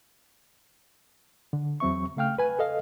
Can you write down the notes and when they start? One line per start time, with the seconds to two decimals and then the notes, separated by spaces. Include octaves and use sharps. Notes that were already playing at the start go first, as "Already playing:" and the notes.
1.53 D3
1.80 E2 F#3 C4 E5 C#6
2.16 C#3 A3 F5 G5 F6
2.38 B4 G#5
2.59 A4 D#5 F5